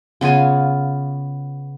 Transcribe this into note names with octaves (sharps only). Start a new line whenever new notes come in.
C#3 B3 F4 G#5